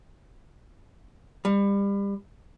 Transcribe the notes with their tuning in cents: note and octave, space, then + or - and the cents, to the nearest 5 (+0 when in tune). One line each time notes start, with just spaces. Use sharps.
G3 +30